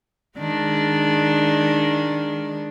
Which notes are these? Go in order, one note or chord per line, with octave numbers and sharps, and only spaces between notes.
D#3 G#3 D4